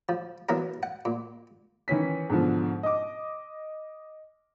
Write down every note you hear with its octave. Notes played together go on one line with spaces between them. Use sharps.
F3
E3 F#3 B3 A#4
F#5
A#2
D#3 E3 C#4 B6
G#2 B2 D3 F3
D#5 D6